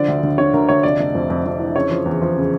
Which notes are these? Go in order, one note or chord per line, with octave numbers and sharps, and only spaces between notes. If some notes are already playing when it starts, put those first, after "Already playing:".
Already playing: D3 F3 D5
D2
D2
D3 C#5
D2 A#4
D2 C#5
F1 D5
F1
F2
F2
F2
E3
C#3 C#5
F3
E2
F3
C#3